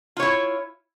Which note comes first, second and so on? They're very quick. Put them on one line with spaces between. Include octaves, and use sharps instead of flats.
F4 C#5 E4